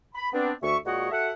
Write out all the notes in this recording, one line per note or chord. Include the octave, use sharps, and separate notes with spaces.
B5
B3 C4 D4
D2 E5 C#6
A#2 G#3 F#4 C#5 D#5 F#5
F#4 A4 E5 F#5